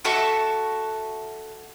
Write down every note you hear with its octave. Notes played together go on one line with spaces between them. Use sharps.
F#4 A4 E5 C#6